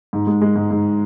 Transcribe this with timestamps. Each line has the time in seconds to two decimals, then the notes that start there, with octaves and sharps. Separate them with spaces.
0.13 G#2
0.27 G#3
0.41 G#3
0.56 G#2
0.71 G#2